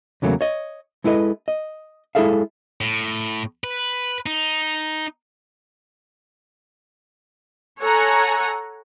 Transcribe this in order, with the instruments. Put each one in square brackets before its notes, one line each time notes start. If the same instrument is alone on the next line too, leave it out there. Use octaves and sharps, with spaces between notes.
[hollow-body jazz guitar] E2 C#3 F#3 A3 A#3
C#5 D#5
G#3 E4 A4 B4 D#5
D#5
G#3 E4 G#4 A4 E5 F5
[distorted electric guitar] A2
B4
D#4
[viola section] A4 C#5 F#5 G#5 A#5